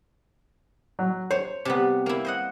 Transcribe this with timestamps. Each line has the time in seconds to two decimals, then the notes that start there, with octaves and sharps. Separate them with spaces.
0.99 F#3
1.31 C5 C#5
1.65 C3 G3 B3
2.06 A#3 E4
2.25 C5 D#5 F#5